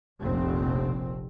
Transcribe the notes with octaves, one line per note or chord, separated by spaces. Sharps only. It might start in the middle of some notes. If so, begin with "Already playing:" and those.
F1 A#1 C4